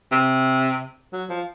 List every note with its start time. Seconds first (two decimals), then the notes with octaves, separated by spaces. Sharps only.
0.12 C3
1.12 F#3
1.30 F3